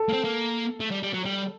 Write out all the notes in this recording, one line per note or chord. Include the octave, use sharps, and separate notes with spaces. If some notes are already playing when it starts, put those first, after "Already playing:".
Already playing: A4
A#3
C4
A#3
A3
G3
G3
F#3
G3